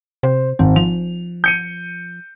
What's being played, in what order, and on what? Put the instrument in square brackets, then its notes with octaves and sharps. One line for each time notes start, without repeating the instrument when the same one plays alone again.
[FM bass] C3 [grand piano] C5
[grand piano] G#1 [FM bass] C4
[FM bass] F3 [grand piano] F7
[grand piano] G6 C#7 D#7